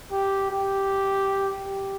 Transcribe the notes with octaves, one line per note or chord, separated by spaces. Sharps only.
G4
G4
G4